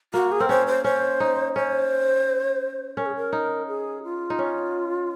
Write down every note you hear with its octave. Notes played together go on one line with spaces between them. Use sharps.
A#3 F#4
G#4
C4 A#4
C#4 C5
C5
C#4 C5
D#4
C#4 C5
C#4 A#4
G#4
A#4
D#4
G#4
F4
D#4
C#4